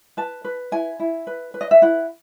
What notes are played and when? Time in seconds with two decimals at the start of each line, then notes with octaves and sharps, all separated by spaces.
0.17 B4 A5
0.44 B4
0.72 E4 G#5
1.00 E4
1.27 B4
1.54 B4
1.61 D#5
1.71 E5
1.82 E4 F#5